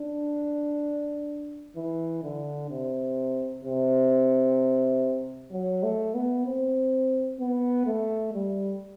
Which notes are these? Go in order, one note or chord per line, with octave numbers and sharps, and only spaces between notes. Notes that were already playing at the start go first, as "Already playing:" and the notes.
Already playing: D4
E3
D3
C3
C3
F#3
A3
B3
C4
B3
A3
G3